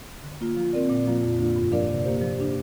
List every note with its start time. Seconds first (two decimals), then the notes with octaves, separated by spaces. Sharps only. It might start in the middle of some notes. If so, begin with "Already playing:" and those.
0.24 D3
0.41 A#3 F4
0.57 F3
0.73 C4 A#4 D5
0.89 A#2
1.07 F3 A#3 F4
1.23 F2
1.39 D3 A#3 D4 F4
1.56 G2
1.72 F3 D4 A#4 D5
1.89 C3
2.05 A#3 G4 C5
2.22 F3
2.38 D4 G4